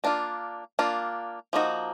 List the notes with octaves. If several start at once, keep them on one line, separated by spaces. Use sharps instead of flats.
A#3 D4 F4
A#3 D4 F4
F3 A#3 D#4 F#4